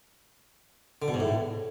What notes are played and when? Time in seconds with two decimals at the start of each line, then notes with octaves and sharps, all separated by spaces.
1.02 D3
1.08 B2
1.14 G#2
1.20 A2